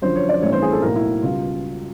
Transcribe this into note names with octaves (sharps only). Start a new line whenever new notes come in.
F#2 D3 F3 C5
C#5
D5
A1 G2 E3 A3 C4 C#5
C5
G#4
A4
B1 A2 F#3 A#3 A#4
E4
C#2 B2 G3 F4